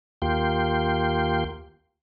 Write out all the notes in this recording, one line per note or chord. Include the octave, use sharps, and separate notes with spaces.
D#2 A#3 F4 G4 G5 C6